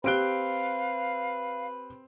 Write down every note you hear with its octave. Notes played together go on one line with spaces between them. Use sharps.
C4 G4 B4 F5 F#6 D7 G7